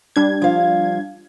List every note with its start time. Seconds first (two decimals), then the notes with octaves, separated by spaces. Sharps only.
0.16 G3 D4 G#6
0.42 F3 F5